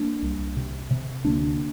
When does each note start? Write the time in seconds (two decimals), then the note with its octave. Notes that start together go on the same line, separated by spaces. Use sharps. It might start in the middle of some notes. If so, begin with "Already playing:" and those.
Already playing: A#3 D4
0.22 C2
0.56 C3
0.91 C3
1.24 D2 A#3 D4